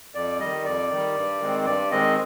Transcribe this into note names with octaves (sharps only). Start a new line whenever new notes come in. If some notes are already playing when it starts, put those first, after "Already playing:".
F2 D5
D#3 G3 D#5
F2 D5
D#3 G3
G2
D#3 G#3 C4
G2 D5
D#3 G#3 C4 D#5